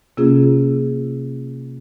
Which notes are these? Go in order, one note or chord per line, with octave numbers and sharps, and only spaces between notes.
C3 A#3 C#4 F4 G#4